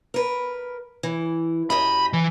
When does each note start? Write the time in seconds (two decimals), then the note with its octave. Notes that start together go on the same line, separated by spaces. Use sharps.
0.14 A#4 B4
1.03 E3
1.70 F#2 G4 D#5 B5
2.13 E3